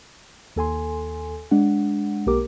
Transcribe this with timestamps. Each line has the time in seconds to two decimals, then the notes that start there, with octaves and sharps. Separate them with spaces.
0.56 D#2 A4 G#5 C6
1.51 G#3 D4 F#5
2.26 B1 A#3 G4 A#4 D6